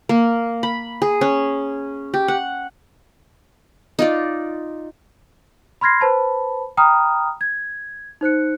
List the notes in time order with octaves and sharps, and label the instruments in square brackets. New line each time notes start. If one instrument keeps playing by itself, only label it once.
[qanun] A#3
B5
G#4
C#4
G4
F#5
D#4 F4 D5
[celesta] B5 C6 F6 G#6 A#6 C7
B4 C5 A5 B5
G5 A#5 B5 D#6 F6
G#6
D#4 C5 F#6 C#7